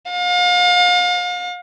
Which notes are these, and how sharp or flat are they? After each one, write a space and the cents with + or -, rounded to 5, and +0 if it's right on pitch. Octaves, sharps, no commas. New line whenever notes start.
F5 +35